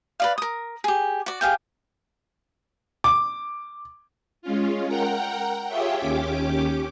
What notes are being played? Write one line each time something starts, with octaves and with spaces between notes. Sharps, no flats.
B4 D5 F5
A#4 D#6
G4 G#4
F#4 D5
G4 G#4 F5 G5
D6
G#3 C#4 F4
A#4 F#5 G5 A#5
F4 G4 G#4 C#5 E5 G5
D#2 C#4 G4 D6